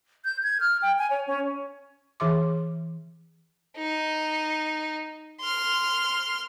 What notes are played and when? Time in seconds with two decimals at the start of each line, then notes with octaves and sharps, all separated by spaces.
0.25 G6
0.43 G#6
0.60 F6
0.82 G5
0.99 G#5
1.10 C#5
1.27 C#4
2.20 E3 G#4 E5 C6 D6
3.77 D#4
5.41 C6 F6